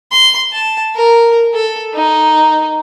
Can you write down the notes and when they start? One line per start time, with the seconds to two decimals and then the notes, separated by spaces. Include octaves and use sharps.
0.12 C6
0.53 A5
0.95 A#4
1.54 A4
1.94 D#4